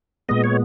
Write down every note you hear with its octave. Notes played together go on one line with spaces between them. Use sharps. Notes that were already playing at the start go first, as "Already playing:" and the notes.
A#2 G#3 B3 D#5
C#5